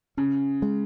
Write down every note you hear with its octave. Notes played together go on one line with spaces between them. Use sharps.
C#3 C#4
G#3